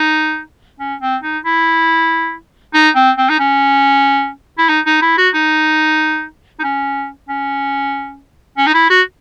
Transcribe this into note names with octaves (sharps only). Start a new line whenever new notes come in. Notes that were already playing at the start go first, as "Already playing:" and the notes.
Already playing: D#4
C#4
C4
D#4
E4
D#4
C4
C4
D#4
C#4
E4
D#4
D#4
E4
F#4
D#4
D#4
C#4
C#4
C#4
D#4
E4
F#4